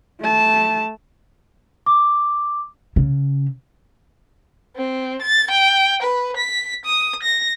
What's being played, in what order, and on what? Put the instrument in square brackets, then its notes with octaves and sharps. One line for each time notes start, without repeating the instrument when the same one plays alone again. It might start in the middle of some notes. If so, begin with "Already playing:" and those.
[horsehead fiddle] A3 A5
[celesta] D6
[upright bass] C#3
[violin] C4
A6
G5
B4
B6
D#6
A#6